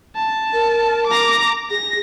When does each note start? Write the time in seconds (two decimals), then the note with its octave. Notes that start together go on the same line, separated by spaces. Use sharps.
0.16 A5
0.53 A#4
1.07 A#5 D6
1.70 G#4 A#6